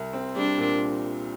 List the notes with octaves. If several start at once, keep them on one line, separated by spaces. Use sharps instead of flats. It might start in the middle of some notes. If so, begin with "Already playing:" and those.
Already playing: C2
C4
G3 D4
A#2